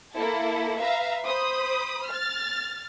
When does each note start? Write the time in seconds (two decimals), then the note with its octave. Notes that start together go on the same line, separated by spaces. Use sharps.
0.15 A#3 E4 A4
0.80 B4 E5 F5 A#5
1.25 C5 B5 D#6
2.08 F6 A6